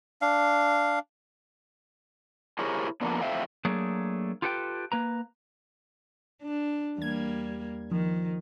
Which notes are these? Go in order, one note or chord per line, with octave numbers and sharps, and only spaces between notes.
D4 F5
E4 G4 G#4 A#4 C5 C#5
D3 F3 A#3 B3 D4
F2 A2 C5 E5 F5 G5
F#3 A3 A#3 D4 G#4
F4 G4 A4 B4 F#5 G5
A#3 B4 A#5
D4
E2 G3 A#3 G#6
D#3 F3